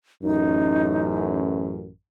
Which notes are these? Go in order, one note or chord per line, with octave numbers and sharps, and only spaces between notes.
A1 F#2 D#4